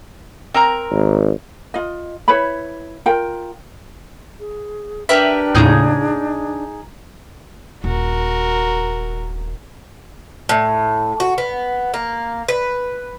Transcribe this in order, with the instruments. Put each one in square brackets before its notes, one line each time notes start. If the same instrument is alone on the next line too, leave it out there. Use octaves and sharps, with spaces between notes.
[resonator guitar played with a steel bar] C4 A#4 A#5
[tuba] G#1
[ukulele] F4 D#5
E4 B4 C#5 B5
F4 A#4 G5
[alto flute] G#4
[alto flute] D4 [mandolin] G4 A#4 B4 [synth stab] E5
[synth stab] D#2 A2 C#3 [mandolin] D#4 G#4 G6
[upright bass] D#1 [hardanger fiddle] F#4 A#4
[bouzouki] A2
F#4
B3
A#3
B4